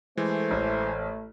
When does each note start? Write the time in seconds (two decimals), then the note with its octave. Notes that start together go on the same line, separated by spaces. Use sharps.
0.17 E3 G#3 A3 C5
0.51 A1